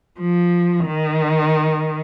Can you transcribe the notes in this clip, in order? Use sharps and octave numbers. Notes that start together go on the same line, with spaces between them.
F3
D#3